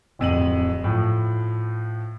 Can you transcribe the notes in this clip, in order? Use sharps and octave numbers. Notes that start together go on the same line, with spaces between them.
D1 F2 D#7 F#7
A2 F3